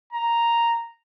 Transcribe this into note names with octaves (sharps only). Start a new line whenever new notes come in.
A#5